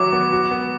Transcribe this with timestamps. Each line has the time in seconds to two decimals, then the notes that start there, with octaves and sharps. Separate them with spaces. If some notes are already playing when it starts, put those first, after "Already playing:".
Already playing: E3 F#3 F#4 D6
0.13 B3
0.32 F#4
0.51 B3